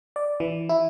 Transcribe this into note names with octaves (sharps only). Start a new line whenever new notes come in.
D5
E3
E4